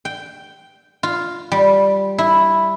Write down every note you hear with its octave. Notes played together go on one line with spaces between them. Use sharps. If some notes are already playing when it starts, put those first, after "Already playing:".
G5
F4
G3
E4